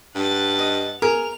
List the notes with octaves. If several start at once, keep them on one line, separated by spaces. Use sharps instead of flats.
G2 F#5 A6
D#5
G#4 A#4 F7